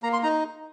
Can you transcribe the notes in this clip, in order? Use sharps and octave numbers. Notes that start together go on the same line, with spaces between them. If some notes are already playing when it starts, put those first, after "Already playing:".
A#3 A#5
C6
D#4 A#5